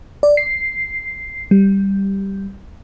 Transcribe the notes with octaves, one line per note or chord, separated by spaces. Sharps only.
D5
C7
G3